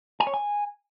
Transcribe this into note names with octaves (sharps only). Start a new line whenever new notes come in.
G#5
C#5
G#5